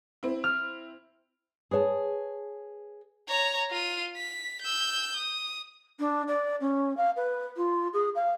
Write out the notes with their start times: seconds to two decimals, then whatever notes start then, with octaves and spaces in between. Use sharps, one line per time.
0.23 C4 E4
0.44 F6
1.71 G#4 B4 C#5 A5
3.29 C#5 A#5
3.71 F4 D#7
4.17 B6
4.62 E6 G6
5.17 D#6
5.99 D4
6.27 D5
6.60 C#4
6.97 F5
7.16 B4
7.56 F4
7.93 G#4
8.15 F5